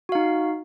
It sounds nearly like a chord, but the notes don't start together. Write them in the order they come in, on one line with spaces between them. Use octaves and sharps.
F#4 F5 D#4